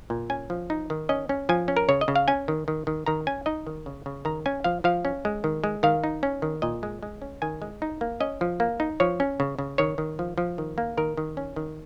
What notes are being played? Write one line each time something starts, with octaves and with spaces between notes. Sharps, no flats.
A#2
C#4 G#5
F3
D#4
D#3
C#4 D#5
C#4
F3 G#5
C#4
A#4
C#3 C#5
D#5
C#3
F5
C#4 G#5
D#3
D#3
D#3
D#3 A#5
C#4 G#5
D#4 D#5
D#3
C#3
C#3
D#3 A#5
C#4 G#5
F3 F5
F3 F5
C#4
G#3
D#3
G#3
D#3 F5
D#4
C#4
D#3
A#2 D#5
G#3
G#3
C#4
D#3 G#5
G#3
D#4
A#3
C#4 D#5
F3
A#3
D#4
F3 C#5
C#4
C#3
C#3
D#3 C#5
D#3
F3
F3
D#3
A#3
D#3 A#4
D#3
C#4
D#3